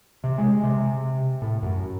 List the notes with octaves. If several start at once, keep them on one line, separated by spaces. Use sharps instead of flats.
C3
G#3
C3
A2
F#2